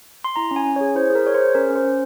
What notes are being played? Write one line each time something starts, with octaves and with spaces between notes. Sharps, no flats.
C6
E4 A#5
C#4
G#5
C#4
G#4 C#5
E4 C5
G#4
A#4
G#4 C#5
C5
G#4
C#4 A#4
C#4
C5
C#4